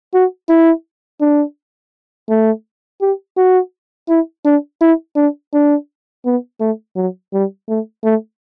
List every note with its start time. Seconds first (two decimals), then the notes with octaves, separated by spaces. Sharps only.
0.14 F#4
0.49 E4
1.21 D4
2.29 A3
3.01 G4
3.37 F#4
4.09 E4
4.45 D4
4.81 E4
5.16 D4
5.54 D4
6.25 B3
6.60 A3
6.96 F#3
7.33 G3
7.69 A3
8.04 A3